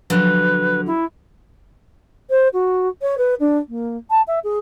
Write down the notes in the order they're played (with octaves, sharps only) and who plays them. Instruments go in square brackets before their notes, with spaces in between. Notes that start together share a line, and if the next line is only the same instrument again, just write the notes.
[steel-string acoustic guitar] D3 F3 F#3 [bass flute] B4
[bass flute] E4
[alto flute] C5
F#4
C#5
B4
D4
A#3
A5
E5
G#4